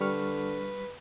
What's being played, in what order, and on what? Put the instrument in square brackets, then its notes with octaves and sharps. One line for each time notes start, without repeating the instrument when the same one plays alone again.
[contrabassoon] D3 [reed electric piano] G3 C#6 F6 [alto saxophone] B4